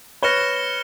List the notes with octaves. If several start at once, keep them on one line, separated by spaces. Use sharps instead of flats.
B4 C#5 F6 A#6 C#7 E7 G7